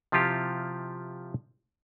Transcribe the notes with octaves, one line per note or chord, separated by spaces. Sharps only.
C3 F3 E4 F4 G4